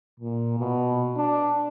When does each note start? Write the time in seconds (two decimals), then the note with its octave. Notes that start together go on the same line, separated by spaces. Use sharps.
0.20 A#2
0.59 B2
1.17 D4